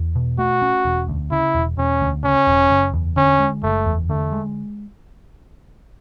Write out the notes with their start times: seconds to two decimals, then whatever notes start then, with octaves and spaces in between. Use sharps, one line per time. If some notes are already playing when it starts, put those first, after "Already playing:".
Already playing: E2
0.15 B2
0.38 A3 F#4
0.62 C#4
0.85 E1
1.08 D2
1.31 C#3 E4
1.55 E1
1.78 E1 C#4
2.01 D2
2.24 C#3 C#4
2.47 E1
2.70 F#1
2.93 E2
3.17 D3 C#4
3.40 G#3
3.63 F#1 A3
3.86 E2
4.09 D3 A3
4.32 G#3